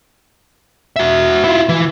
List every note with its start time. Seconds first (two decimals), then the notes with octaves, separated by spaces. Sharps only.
0.96 F#4 E5
1.44 E4 F4
1.69 E3